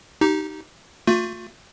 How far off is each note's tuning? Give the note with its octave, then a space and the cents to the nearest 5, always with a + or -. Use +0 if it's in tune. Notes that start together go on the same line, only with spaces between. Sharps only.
D#4 +0 G4 -20
A3 +40 F4 +35